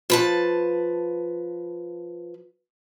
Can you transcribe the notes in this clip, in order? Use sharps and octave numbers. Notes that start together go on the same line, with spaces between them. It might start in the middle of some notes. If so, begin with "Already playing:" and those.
F3 B4 A5